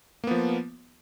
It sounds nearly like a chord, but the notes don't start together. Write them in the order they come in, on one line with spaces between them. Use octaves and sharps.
A#3 B3 F3